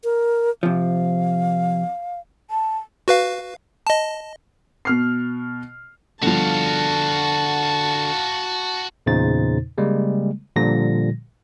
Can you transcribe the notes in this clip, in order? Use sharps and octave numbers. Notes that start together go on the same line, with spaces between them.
A#4
C3 F3 F5
A5
F#4 B4 F5
D#5 A5
B2 F6 C7
G2 B2 D3 F3 F#4 F5 A5
E2 A#2 C#3 D#4 C5 A6
C#3 G3 G#3 A#3
A#2 D3 F3 G3 A#6